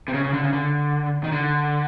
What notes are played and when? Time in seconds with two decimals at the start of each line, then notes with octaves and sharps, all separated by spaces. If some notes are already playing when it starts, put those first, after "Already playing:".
0.08 C3
0.14 C#3
0.24 C#3
0.33 D3
0.43 C#3
0.53 D3
1.24 D#3
1.32 D3